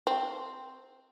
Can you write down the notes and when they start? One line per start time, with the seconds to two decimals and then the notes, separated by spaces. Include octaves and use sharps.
0.07 C4